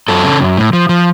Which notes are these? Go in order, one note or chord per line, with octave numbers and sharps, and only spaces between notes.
F#2 A4
C#3
F#2
A2
F3
F3